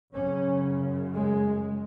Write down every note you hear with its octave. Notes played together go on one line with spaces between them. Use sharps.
F#2 C#3 C#4
G#3